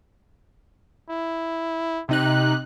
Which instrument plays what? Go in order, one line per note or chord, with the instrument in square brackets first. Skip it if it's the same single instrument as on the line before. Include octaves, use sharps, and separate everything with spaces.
[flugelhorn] E4
[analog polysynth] C3 D#4 F#6 [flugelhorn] G4